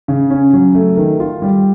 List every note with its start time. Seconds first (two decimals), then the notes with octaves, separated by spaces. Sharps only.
0.08 C#3
0.30 C#4
0.53 F#3
0.75 A3
0.97 D#3
1.20 F4
1.42 G3